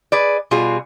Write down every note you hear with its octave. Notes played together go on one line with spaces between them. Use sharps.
G#4 B4 D5
B2 G3 F4 F#4 G#4